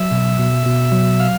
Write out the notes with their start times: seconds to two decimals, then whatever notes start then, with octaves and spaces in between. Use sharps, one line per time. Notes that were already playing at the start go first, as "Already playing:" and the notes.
Already playing: F#3 E5
0.12 B2
0.39 B2
0.66 B2
0.92 F#3
1.20 F5